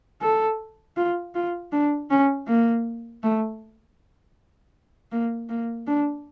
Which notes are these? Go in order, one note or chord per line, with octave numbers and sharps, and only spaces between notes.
A4
F4
F4
D4
C#4
A#3
A3
A#3
A#3
D4